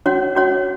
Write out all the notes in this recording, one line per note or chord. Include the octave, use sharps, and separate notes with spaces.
C#4 F#4 C#5 F#5
C#4 F#4 C#5 F#5